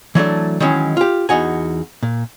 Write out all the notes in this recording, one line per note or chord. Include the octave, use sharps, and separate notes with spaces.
E3 F#3 A3 D4
D#3 E3 F#3 G#3 C#4
F4 G4
E2 D#4 F#4 G#5
A#2